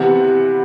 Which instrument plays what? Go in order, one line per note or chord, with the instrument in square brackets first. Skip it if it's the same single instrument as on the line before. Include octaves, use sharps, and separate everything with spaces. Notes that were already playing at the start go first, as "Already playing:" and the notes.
Already playing: [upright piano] C3 E3 B3 F#5